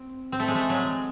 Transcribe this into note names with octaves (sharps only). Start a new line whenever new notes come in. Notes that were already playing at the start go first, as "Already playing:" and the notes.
Already playing: C4
C4
A3
G#3
A3
F#3 G#3